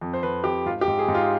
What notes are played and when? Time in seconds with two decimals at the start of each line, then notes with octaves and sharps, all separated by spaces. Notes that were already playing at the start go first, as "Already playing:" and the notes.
0.01 F2
0.14 C5
0.23 F2 B4
0.44 F2 G4
0.66 G#2 F4
0.81 G4
0.88 G#2
0.99 G#4
1.08 G#2
1.14 F4